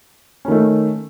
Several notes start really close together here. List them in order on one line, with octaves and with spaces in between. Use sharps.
C#4 D#3 A3